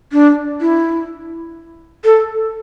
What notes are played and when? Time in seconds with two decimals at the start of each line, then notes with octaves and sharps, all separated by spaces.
0.12 D4
0.61 E4
2.05 A4